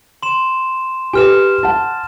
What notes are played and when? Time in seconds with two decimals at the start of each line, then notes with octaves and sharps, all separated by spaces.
0.23 C6 E7
1.13 G4 A4 B4 G#5 F6 E7
1.63 F#5 A5